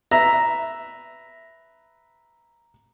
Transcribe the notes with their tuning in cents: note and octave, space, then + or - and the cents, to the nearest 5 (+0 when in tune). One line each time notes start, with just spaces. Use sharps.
B4 +0 E5 +0 A#5 +0